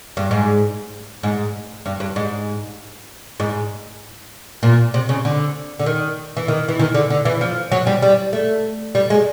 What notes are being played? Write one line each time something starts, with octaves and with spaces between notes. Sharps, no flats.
G2
G#2
G#2
G2
G2
G#2
G#2
A#2
C3
C#3
D3
D3
D#3
E3
D#3
E3
D#3
D3
D3
E3
F3
F#3
G3
G3
A3
G3
G#3